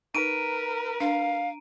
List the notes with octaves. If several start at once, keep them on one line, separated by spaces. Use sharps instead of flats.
D#4 A#4 B4 A#5 D7 D#7
D4 F5